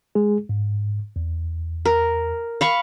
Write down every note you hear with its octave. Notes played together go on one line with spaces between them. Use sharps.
G#3 G#4
G#2
E2
A#4
F5 B5 C#6